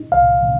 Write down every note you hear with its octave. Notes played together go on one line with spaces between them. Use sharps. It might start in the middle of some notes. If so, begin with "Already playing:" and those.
Already playing: D#4
C2 F5